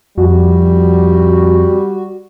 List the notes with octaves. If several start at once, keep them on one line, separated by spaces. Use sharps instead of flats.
F2 G3 F#4